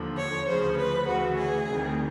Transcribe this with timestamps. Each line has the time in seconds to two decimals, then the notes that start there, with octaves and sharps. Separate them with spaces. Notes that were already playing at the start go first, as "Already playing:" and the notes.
Already playing: D#2 D3 F3
0.17 C#5
0.47 D2 C#3 F3 C5
0.77 B4
1.07 D2 C#3 E3 F#4
1.37 G#4
1.67 D2 C3 D#3 G3